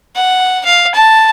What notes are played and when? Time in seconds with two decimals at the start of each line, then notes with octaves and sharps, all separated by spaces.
0.16 F#5
0.65 F5
0.95 A5